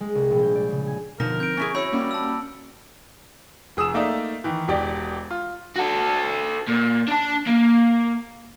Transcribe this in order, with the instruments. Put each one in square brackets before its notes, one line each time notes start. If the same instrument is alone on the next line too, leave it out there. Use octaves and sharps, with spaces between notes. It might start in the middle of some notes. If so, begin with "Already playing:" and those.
[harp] G#3
C2
A#1
G6
D5
C#3
G#5
[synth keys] B2 D3 F3 [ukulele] D#4 [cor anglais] A#4 [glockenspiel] A#6
[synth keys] C4 [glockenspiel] G6 D7
[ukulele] C#4 E4 G#4 [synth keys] C#6
[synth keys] E4 F#4 [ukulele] C#5 [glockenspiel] B5 E6 C#7
[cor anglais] G3 [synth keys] A#3 C#4 F#4
[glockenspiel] A5 E6
[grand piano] F1 G#4 D#6 E6 E7
A3 A#3 D#4 D5 E5
D#3 E3
E1 E2 G4 D5
F4
[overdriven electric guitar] F#4 A4
A#2
D4 A5
A#3